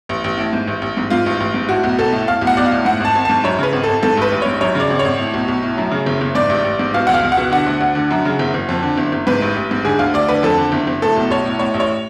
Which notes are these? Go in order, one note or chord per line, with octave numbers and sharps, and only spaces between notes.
A1
A1
A2
G#2
A1
A1
G#2
G#2 F4
A1
A1
G#2
A2 F#4
B1
B1 A4
A2
A2 F5
B1
F#5
B1 D5
F5
A2
G#2 F#5
G#1 A5
G#1
G#2 A5
F#2 C#5
C#3 B4
G#1
G#1 A4
G#2 A4
A1 B4
A1
G#2 C#5
F#2 C#5
C#3 D5
G#1
C#5
G#1
A2
B1
B1
A2
F#2
C#3
F#1
F#1
G#2 D5
A1
A1
G#2
B2 F5
C#2 F#5
F5
C#2
F#5
B2
D3 F#5
D2
D2
D3
F#2
C#3
F#1
F#1
F2
D3
F#1
F#1
G#2 B4
A1
A1
G#2
D3 G#4
D2 F5
D2 D5
D3 B4
F2 A4
D3
F#1
F#1
A2 A4
B1
B1 C#5
A2
A2 C#5
A1
C#5